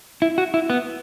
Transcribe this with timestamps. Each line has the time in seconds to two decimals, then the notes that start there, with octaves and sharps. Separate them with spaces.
0.22 E4
0.38 F#4
0.54 E4
0.70 B3